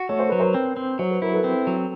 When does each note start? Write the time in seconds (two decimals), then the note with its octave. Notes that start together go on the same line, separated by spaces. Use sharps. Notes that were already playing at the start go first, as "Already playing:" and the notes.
Already playing: F#4
0.09 A3 C#5
0.19 C5
0.29 F#3 B4
0.40 A#4 C5
0.54 C4
0.77 C4
0.99 F#3 C5
1.11 B4
1.22 E4 A#4
1.34 A4 B4
1.44 C4
1.67 F#3